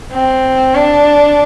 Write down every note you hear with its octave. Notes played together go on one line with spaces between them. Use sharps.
C4
D4